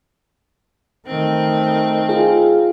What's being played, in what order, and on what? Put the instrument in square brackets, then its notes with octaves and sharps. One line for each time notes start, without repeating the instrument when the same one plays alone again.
[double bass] D#3 A3 [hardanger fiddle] C4
[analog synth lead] F4 [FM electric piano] G#4